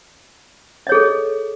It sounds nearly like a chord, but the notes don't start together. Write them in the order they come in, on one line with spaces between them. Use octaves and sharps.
D#5 C#5 G#4 A4